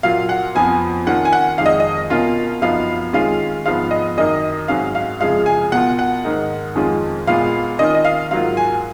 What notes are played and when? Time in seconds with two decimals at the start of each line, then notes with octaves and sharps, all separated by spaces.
0.03 A#2 F#3 A#3 F4 F5
0.29 F#5
0.55 F2 F3 B3 G#5
1.07 D#3 A#3 C#4 F4 F#5
1.25 G#5
1.33 F#5
1.58 F2 D#3 G#3 F5
1.66 D#5
1.80 D#5
2.10 B2 A#3 C#4 F4 F5
2.62 F#2 F3 B3 D#4 F5
3.13 D#3 G#3 C#4 F4 F5
3.66 G#2 F3 B3 F5
3.91 D#5
4.17 F#2 D#3 A#3 D#5
4.68 G#2 F#3 C#4 F5
4.95 F5
5.20 F#2 C#3 F3 G#3 F5
5.46 G#5
5.72 B2 A#3 F4 F#5
5.99 F#5
6.24 G#2 D#3 A#3 D#4
6.75 F2 D#3 G#3 C#4 F4
7.27 A#2 G#3 B3 F4 F5
7.79 D#3 A#3 C#4 F4 D#5
7.94 D#5
8.05 F5
8.31 G#2 F#3 A#3 F4 F5
8.57 G#5